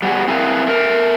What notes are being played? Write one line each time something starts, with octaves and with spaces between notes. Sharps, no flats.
G3 B3 F#4 G#4
C4 E4 G#4 A#4 B4 F5
A3 A#4